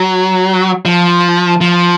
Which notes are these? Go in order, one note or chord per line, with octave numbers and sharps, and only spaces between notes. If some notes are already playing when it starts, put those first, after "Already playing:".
Already playing: F#3
F3
F3